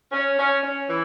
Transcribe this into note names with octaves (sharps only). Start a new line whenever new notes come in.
C#4
C#4
C#4
E3